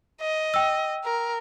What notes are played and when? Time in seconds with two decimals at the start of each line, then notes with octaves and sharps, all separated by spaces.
0.21 D#5
0.54 G5 E6
1.04 A#4